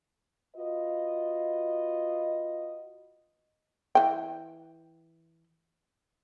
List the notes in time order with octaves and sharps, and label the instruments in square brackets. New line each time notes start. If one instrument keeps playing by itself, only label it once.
[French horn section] F4 F#4 B4 D#5
[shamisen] E3 G5